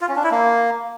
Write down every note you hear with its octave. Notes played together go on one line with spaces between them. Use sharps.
F4
C#4
D4
E4
A#3